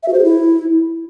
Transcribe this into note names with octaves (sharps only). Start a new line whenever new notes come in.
E5
F#4
C5
G#4
E4